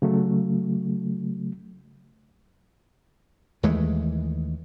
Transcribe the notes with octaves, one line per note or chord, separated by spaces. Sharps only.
C#3 F#3 A3
D#2 E3 G#3 A3